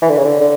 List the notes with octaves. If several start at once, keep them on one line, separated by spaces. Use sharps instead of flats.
E3
D3
C#3
D3
D3